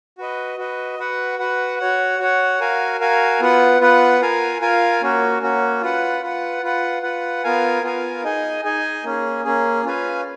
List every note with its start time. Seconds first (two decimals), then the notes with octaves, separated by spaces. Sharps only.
0.18 F#4 B4 D#5
0.58 F#4 B4 D#5
0.99 F#4 B4 F#5
1.39 F#4 B4 F#5
1.79 F#4 C#5 F#5
2.20 F#4 C#5 F#5
2.60 F#4 A#4 F5 G#5
3.00 F#4 A#4 F5 G#5
3.40 B3 F4 B4 F#5
3.81 B3 F4 B4 F#5
4.21 F4 A#4 F5 G#5
4.61 F4 A#4 F5 G#5
5.01 A#3 C#4 F#4
5.41 A#3 C#4 F#4
5.82 F4 B4 F#5
6.22 F4 B4 F#5
6.63 F4 B4 F#5
7.03 F4 B4 F#5
7.44 B3 F4 A#4 F5 G#5
7.83 B3 F4 A#4 F5 G#5
8.24 D#4 G#4 D#5 G#5
8.64 D#4 G#4 D#5 G#5
9.04 A#3 C#4 G#4
9.45 A#3 C#4 G#4
9.85 C#4 F4 B4 F5 G#5